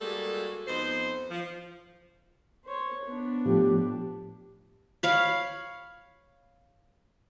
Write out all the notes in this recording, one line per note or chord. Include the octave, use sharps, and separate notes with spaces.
G3 G#3 A#3 F#4 G#4 A4
F2 B3 D#4 C5
F3
C5 C#5
B3 D4
A2 F3 G4
C#5 F5 B5